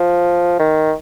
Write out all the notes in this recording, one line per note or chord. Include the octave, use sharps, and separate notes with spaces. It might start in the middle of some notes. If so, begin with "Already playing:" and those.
Already playing: F3
D#3